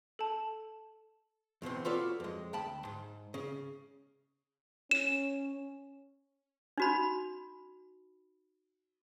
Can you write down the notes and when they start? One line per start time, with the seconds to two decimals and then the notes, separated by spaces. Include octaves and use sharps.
0.19 A4 A5
1.62 E2 B2 E3 C4
1.85 F4 F#4 A4 B4 C#5 D5
2.20 F2 G#3
2.53 D2 G5 A5 B5
2.85 G#2
3.34 C#3
4.91 C#4 E7
6.78 D#4 F#4 B5